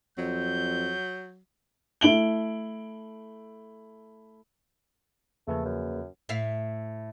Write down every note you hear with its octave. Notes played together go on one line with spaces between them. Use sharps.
F2 F#3 G6
A3 E4 D7 F#7 G7
E2 C#3 F3 A3 A#3 G#4 B4
F#2
A2 E5 F5